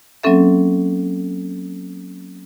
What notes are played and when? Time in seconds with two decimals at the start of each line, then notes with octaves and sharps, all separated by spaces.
0.23 F#3 A#3 C4 C#4 A4 E5